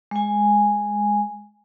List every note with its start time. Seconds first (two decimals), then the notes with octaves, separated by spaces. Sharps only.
0.11 G#3 G#5